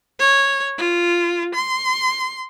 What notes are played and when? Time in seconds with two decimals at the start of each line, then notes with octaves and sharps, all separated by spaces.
0.20 C#5
0.78 F4
1.55 C6